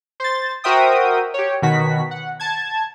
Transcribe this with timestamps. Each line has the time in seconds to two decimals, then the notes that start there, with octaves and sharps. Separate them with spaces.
0.20 C5 A6
0.64 F#4 A#4 C5 E5 G5 D#6
1.34 G4 C#5
1.62 B2 D#3 F#4 B6
2.11 F#5
2.40 A5 G#6